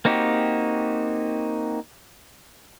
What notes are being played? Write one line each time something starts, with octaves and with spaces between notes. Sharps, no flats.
A#3 C4 D#4 F#4 G4